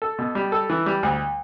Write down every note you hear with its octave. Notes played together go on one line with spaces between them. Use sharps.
A4
B2
G3
A4
E3
G3
D2